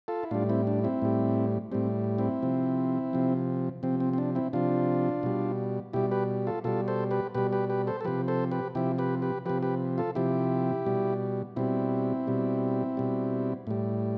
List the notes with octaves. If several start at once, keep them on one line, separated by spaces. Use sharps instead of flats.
F4 A4
E4
A2 G3 D4 F4
C4 E4
D4
C4 E4
A2 G3
A2 G3 C4
C4 E4
C3 F3
C3 F3
C3 F3 C4
C4
C4
D4
C4 E4
C3 F3 D4 F4
B2 G3
B2 G3 E4 G4
G4 B4
F4 A4
B2 G3 F4 A4
A4 C5
G4 B4
B2 G3 G4 B4
G4 B4
G4 B4
A4 C5
A4
C3 F3 G4 B4
A4 C5
G4 B4
C3 F3 E4 G4
G4 B4
G4 B4
C3 F3 G4 B4
G4 B4
F4 A4
C3 F3 E4 G4
B2 G3
B2 G3 C4 E4
B2 G3
B2 G3
A2 G3